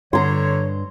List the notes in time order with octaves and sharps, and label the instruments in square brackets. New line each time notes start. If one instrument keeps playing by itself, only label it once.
[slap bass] G2 [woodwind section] D3 C#5 [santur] A#5 C6